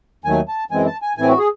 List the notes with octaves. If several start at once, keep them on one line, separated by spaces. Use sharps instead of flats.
D#2 D#3 F#3 A3 G#5
A5
F#2 E3 G#3 C4 G#5
A5
G#5
A2 E3 C4 G#5
F#4
G#4